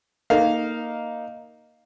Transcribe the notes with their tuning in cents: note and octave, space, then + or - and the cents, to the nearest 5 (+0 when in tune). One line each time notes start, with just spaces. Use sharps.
A#3 +0 D#4 +0 F5 +0